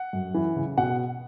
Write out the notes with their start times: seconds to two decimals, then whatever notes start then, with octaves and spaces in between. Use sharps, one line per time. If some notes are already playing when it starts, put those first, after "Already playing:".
Already playing: F#5
0.13 F#2
0.34 E3
0.56 C#3
0.78 B2 F#5